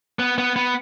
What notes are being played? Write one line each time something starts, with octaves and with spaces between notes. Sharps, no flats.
B3
B3
B3